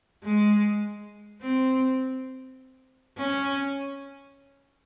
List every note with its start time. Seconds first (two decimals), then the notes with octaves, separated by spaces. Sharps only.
0.24 G#3
1.41 C4
3.18 C#4